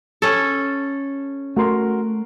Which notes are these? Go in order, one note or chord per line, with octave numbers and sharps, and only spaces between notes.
C#4 A4
A3 F#4 A#4 C6